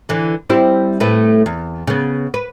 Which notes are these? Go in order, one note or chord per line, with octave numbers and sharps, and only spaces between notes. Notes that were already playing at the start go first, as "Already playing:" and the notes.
D3 E3
G3 C4 E4
A2 A3 B4
E2
C#3 B3
B4